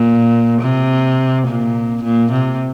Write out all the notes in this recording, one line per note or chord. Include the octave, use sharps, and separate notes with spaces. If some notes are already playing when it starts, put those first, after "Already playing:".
Already playing: A#2
C3
A#2
A#2
C3